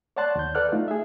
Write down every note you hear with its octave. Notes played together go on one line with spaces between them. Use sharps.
C#5 D5 F#5 A5 C6 F#6
D#2 G6
A4 B4 D5 F#5 F6 F#6
A3 D#4 F4
G#4 E5